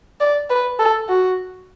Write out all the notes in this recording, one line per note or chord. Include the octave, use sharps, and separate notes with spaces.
D5
B4
A4
F#4